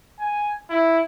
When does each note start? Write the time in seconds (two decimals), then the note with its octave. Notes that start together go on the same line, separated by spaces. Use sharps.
0.19 G#5
0.70 E4